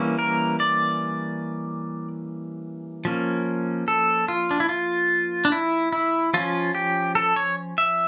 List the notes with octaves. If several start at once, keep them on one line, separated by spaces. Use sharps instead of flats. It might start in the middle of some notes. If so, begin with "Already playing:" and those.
Already playing: E3 G3 A#3 C#4
A#4
D5
F3 A#3 C#4
A4
F4
D4
E4
F4
D4
E4
E4
F3 C#4 F4
G4
A4
C#5
E5